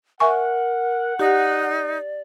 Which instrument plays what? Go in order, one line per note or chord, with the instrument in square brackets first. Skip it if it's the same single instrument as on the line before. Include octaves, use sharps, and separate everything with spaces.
[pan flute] A#4 [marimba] E5 G#5 C#6 [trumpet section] F#5
[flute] D#4 [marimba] G4 [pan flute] D5